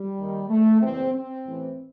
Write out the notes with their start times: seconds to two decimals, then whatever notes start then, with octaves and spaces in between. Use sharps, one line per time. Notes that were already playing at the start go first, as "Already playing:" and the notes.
Already playing: G3
0.18 D#2 D#3
0.49 A3
0.82 F#1 E2 B2 C4
1.13 C4
1.45 A1 A2 E3